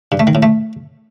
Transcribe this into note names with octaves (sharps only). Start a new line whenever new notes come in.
G2
A3
D#3
A2
A3